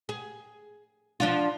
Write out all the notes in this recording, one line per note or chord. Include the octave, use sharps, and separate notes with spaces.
G#4
F3 D4 F4